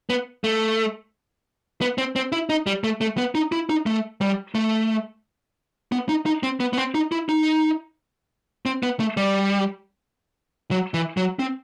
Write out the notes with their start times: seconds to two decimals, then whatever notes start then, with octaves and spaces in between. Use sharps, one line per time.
0.10 B3
0.44 A3
1.81 B3
1.98 C4
2.16 C4
2.32 E4
2.49 D#4
2.67 G3
2.84 A3
3.01 A3
3.18 B3
3.35 D#4
3.52 E4
3.69 D#4
3.86 A3
4.21 G3
4.55 A3
5.92 B3
6.09 D#4
6.26 D#4
6.43 C4
6.60 B3
6.73 B3
6.78 C4
6.94 D#4
7.12 E4
7.29 D#4
8.66 C4
8.83 B3
9.00 A3
9.17 G3
10.71 F#3
10.94 E3
11.17 F#3
11.39 C4